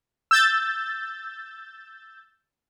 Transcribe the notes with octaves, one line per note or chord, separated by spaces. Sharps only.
E6 G6 A6